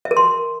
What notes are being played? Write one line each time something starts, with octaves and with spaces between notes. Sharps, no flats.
E5
A#4
C6